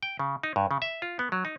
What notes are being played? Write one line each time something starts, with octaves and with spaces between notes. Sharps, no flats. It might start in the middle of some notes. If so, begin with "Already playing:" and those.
G5
C#3
D#4
G2
C#3
E5
F4
B3
F#3
D#4